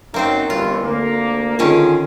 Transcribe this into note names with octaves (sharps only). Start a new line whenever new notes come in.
F#2 F#3 A#3 C4 D#4 C5
G1 D#2 E3 F4
D2 A#3
D3 D#3 C#4 F4 G#4